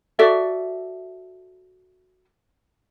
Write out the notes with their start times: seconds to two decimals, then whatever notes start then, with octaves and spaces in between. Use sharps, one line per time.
0.19 F#4 A4 D5 E5